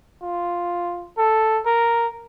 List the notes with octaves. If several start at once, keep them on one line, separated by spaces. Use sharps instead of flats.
F4
A4
A#4